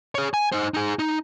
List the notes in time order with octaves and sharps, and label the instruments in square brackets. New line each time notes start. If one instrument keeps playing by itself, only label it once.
[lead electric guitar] G#4 C#5
G#5
D#4 C5
D#4 G#4
D#4